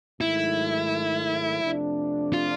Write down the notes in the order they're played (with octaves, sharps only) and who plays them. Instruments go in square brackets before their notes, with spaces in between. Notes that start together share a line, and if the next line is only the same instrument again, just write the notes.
[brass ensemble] G#2 D#3 F#3 A3 [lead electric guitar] E4
[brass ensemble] F2 C3 F3 A3 D4
[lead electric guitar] F4